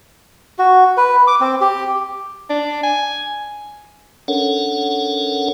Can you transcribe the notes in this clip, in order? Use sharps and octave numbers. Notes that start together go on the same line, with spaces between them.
F#4
B4
D6
C4
G4
D4
G#5
C#4 D4 A4 A#4 C#5 F#5